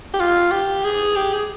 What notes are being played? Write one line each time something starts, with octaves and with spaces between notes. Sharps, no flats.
G4
F4
G4
G#4
G4
G#4